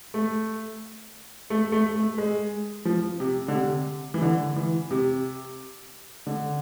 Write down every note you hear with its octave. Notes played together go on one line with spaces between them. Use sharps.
A3
A3
A3
A3
G#3
F3
C3
D3
C3
E3
D3
E3
C3
D3